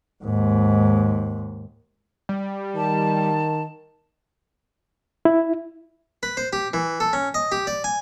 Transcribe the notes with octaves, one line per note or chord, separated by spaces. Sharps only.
D#2 G#2
G3
D#3 A5
E4
B4
C5
G4
E3
A4
C#4
D#5
G4
D5
G#5